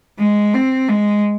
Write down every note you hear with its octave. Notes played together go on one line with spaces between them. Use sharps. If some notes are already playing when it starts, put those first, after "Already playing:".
G#3
C4
G#3